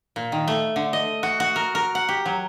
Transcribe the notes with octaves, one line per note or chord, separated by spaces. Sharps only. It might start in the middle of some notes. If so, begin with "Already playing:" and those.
A#2
D#3
A3
D3
D#5
F#4
F#4
A#4
A#4
F#5
G4
F#3